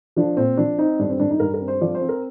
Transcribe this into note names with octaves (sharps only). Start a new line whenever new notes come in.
F3 D4
A#2 C4
F3 D4
C4 D#4
G2 D4
C4
G2 D4
D#4
G2 A#4
A#4
C4
C5
F3 D5
C5
C4
A#4